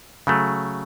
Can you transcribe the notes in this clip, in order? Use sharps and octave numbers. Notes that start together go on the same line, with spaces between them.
C#3 F#3 A3